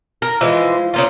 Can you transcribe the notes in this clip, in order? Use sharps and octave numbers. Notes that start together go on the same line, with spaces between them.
A#4
E3 F3 G#3
C#3 A#3 F4